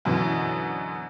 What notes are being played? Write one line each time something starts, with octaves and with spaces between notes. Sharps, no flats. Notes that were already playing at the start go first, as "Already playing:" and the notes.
F#2 B2 D3 E3